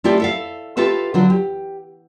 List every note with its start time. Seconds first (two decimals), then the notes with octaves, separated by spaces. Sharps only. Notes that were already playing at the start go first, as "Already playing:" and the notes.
0.04 A3 E4 F4 G4 D5
0.20 A4 E5 F5
0.77 F4 G4 A4 B4 E5
1.14 D3 F#3 F4
1.30 G4